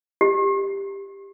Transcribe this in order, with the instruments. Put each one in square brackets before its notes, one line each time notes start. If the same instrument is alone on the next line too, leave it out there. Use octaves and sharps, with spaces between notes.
[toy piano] G4